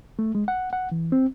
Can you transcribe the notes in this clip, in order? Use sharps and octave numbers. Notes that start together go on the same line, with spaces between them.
A3
G#3
F#5
F#5
E3
C4